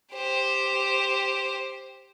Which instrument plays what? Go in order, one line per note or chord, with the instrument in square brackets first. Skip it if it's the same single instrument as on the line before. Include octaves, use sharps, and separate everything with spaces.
[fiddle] G4 C5